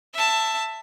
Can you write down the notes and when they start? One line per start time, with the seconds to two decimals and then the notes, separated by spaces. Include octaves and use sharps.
0.14 E5 A5